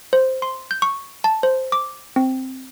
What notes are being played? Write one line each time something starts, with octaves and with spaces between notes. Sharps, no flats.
C5
C6
G6
C#6
A5
C5
D6
C4